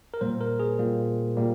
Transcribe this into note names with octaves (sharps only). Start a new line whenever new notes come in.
A#4
A#2 G3 A#3 C5
A#4
G#4
A#2 G3 A#3
A#2 G3 A#3